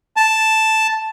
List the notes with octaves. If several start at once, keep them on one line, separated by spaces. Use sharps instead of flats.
A5